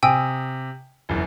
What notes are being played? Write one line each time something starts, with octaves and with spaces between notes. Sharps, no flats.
C3 G5 G#5 D#6 E6
F#1 E2